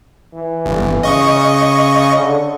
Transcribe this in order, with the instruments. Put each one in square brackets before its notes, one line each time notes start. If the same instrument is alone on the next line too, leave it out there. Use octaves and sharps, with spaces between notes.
[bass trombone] E3
[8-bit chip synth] G1
[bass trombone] C#3 [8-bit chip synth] D#5 C#6
[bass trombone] D3